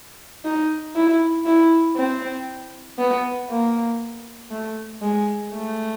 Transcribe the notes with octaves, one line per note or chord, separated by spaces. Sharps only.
D#4
E4
E4
C4
B3
A#3
A3
G#3
A3